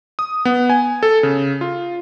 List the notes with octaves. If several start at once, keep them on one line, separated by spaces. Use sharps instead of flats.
D#6
B3
G#5
A4
C#3
F4